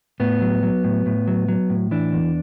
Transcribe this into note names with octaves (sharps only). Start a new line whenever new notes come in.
A2 B3
F#3
F#3
A2
A2
F#3
F#3
A2
E3 D4
E2